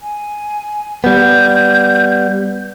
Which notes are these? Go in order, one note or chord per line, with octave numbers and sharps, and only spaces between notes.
G#5
G3 B3 G6